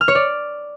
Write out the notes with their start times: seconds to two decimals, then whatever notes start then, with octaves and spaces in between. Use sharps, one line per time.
0.01 F6
0.08 C#5
0.15 D5